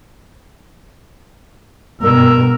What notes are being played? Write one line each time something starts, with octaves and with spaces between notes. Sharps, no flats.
G2 B2 A#4 E6